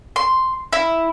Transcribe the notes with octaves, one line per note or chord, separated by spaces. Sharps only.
C6
E4